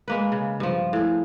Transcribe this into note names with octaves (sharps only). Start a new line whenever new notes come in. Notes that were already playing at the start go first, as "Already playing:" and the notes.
G#3 A#3 B4
C#3
G2 F3
A2 G#4